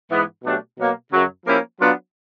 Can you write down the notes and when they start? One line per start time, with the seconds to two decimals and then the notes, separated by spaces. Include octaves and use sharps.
0.10 G#2 E3 G#3 B3
0.43 B2 F#3 A3 D4 G4
0.78 B2 F#3 A#3
1.12 F#2 C#3 F#3
1.45 F3 A#3 C#4 E4 G4
1.79 F#3 B3 D4 F4